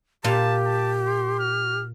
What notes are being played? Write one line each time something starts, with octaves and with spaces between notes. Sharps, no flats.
A#2 F4 G4 A5
A5
C6
F6